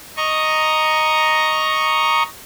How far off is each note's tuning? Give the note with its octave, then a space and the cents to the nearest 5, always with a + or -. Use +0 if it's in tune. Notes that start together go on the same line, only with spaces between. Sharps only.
D#5 +0 A#5 +0 C#6 +0